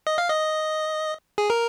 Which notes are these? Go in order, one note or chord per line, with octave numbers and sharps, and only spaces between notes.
D#5
F5
D#5
G#4
A#4